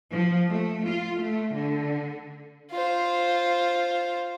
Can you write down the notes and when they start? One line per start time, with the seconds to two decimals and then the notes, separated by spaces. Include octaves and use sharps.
0.12 F3
0.50 A3
0.87 F4
1.22 A3
1.56 D3
2.71 F4 C5